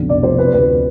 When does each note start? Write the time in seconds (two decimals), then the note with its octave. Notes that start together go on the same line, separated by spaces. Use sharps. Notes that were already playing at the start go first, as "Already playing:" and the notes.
Already playing: B1 F2 D3
0.09 F1 D5
0.23 F3 C5
0.38 C3 B4
0.53 D2 B4